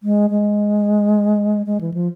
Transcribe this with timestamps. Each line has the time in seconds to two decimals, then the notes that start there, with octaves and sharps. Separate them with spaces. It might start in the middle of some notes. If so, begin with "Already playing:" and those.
0.03 G#3
0.30 G#3
1.66 G#3
1.81 E3
1.94 F3